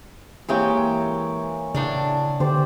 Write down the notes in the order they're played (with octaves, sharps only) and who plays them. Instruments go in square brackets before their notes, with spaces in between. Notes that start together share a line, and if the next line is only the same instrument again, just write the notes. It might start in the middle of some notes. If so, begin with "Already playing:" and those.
[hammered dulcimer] E3 A#3 C#5 [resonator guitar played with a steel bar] G#3 C4 G4
[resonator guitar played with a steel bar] A2 D4 D5 [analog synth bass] C#3
[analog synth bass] D3 [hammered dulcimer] G4 C5 D5